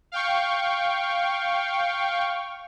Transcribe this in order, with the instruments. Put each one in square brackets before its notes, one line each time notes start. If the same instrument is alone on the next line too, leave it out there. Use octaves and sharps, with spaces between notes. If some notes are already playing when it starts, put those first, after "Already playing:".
[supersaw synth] F5 G5 C#6